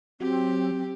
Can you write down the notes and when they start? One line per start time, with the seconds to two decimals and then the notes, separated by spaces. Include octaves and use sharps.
0.20 F#3 C4 G4